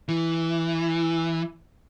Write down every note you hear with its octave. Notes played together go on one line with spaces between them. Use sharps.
E3